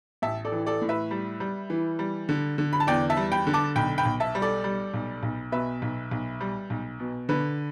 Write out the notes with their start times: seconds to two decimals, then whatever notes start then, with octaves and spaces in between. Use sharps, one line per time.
0.22 A1 E5 A5
0.45 A4 D5
0.52 E3
0.66 A4 D5
0.82 A2
0.89 B4 E5
1.11 G3
1.40 G3
1.70 E3
1.99 G3
2.29 D3
2.58 D3
2.73 B5
2.80 A5
2.87 E2 D5 G5
3.10 E5 A5
3.17 G3
3.32 G5 B5
3.47 D3
3.54 A5 D6
3.76 B1 G5 B5
3.98 G5 B5
4.05 B1
4.20 E5 A5
4.35 G3
4.42 A4 D5
4.64 G3
4.94 B1
5.23 B1
5.52 B2 B4 E5
5.82 B1
6.11 B1
6.41 G3
6.70 B1
7.00 B2
7.29 D3 B4